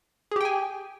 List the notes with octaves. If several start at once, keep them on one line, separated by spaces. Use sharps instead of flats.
G4 G#4 G5 G#5